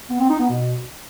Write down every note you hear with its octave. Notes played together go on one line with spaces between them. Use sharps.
B3
C4
D#4
B3
B2